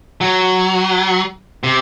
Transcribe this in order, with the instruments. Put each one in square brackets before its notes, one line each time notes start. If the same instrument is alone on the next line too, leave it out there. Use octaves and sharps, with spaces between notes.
[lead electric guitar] F#3
C3